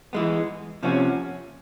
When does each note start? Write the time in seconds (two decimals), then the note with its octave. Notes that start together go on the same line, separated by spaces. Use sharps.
0.13 E3 G#3 B3
0.83 C3 F3 A#3 C#4 F#4